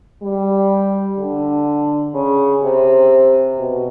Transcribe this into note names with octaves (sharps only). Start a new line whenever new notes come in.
G3
D3
C#3
C3
B2